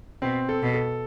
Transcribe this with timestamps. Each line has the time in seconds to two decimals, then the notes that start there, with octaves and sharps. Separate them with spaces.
0.22 B2 C4
0.49 A4
0.62 B2
0.74 A4